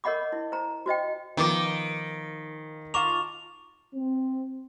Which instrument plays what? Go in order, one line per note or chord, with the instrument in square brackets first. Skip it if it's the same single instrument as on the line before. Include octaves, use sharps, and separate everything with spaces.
[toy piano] A#4 C#5 D#5 F#5 B5 D6
E4
C5 A#5
F#4 C5 D#5 G5
[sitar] D#3 [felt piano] F3 B3 [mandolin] A#5 D6
[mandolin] F4 A5 D6 [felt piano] A#5 [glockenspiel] C#6 F7
[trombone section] C4